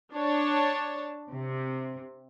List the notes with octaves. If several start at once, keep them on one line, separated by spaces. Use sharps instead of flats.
D4 C#5 A5
C3